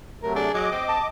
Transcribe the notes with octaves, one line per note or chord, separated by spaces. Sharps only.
C3 F#3 A3 A#4
D4 G#4
F#3 D#5 D6
C4
A5